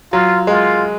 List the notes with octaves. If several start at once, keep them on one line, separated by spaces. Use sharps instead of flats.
F#3 F4
G#3 F4